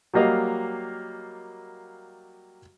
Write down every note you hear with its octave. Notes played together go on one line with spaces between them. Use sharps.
F#3 G3 A#3 D#5 F5